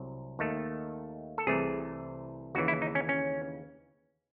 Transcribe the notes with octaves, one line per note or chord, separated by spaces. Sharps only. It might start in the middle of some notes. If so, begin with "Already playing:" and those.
Already playing: C2 C3 F#3
D#2 D#3 A3
A4
C2 C3 E3 A3 G#4
D#2 C#3 E3 F#4
E4
D#4
C#4
C#4